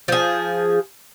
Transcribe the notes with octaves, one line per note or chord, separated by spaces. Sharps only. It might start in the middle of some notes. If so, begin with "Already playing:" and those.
F3 G#4